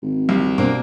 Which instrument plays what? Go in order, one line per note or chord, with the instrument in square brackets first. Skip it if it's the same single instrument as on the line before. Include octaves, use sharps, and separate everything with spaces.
[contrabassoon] G#1
[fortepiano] C2
[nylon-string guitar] B2 C4 D4 [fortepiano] A#3